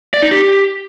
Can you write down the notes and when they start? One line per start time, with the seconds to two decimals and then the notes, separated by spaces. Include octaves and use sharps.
0.14 D5
0.22 D#4
0.31 G4